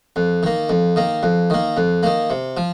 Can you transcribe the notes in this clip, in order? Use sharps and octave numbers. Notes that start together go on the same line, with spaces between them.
F2
D#3 A#3
F2
D#3 A#3
F2
D#3 A#3
F2
D#3 A#3
C3
F3